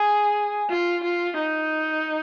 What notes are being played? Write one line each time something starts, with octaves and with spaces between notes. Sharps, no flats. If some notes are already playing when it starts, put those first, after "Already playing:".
Already playing: G#4
F4
F4
D#4